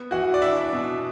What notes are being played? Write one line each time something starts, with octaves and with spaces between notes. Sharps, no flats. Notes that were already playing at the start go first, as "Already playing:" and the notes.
Already playing: B3
E3 F#4 F#5
D5
D4 E4 E5
B2